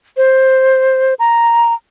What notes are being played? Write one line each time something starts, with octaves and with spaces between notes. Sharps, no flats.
C5
A#5